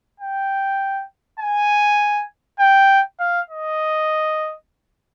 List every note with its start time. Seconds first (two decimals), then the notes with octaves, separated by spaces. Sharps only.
0.20 G5
1.39 G#5
2.60 G5
3.20 F5
3.50 D#5